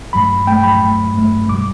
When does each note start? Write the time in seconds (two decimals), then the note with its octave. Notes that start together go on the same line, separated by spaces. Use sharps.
0.13 G2 F#3 A3 B5
0.47 G2 F#3 A3 G5
0.64 B5
0.81 G2 F#3 A3
1.14 G2 F#3 A3
1.49 B2 G3 D6